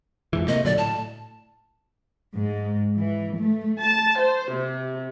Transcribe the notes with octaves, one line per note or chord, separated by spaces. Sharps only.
F2 G#2 E3
C3 A3 A#3 D#5
A#2 D3 F#3 D5
A2 A5
G#2
E3
A3
A5
C5
C3